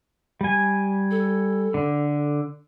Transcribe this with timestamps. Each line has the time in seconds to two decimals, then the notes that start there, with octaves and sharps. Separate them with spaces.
0.41 G3 G#5
1.11 A4
1.74 D3